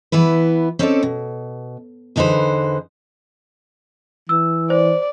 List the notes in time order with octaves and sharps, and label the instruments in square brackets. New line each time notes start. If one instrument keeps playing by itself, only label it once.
[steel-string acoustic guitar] E3 B3 E4 B4
C4 C#4 D#4 E4 A4 D5
B2
E2 D3 D#4 F#4 B4 C5
[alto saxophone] E3 [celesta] E6
[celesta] C5 [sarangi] D5